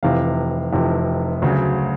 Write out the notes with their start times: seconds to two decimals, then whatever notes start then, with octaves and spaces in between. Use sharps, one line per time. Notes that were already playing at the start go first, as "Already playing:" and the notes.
0.03 F1 F2 C3 E3 F5
0.73 F1 F2 C3 E3
1.42 D2 C#3 F#3